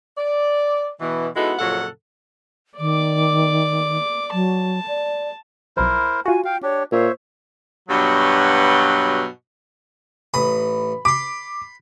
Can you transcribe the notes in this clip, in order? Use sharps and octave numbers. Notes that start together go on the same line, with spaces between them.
D5
B2 E3
G#3 B3 D#4 E4 F#4 A4
F2 A#2 C#3 F#3 A4 F#5
D#3 D5 D6
F#3 A5
D5
B1 F3 E4 A#4 C5
F4 F#4 G#5
F5 G5
D4 G4 C#5
A#2 C5 C#5 E5
G2 B2 F#3
A1 B5 D#6
B5 C6 D6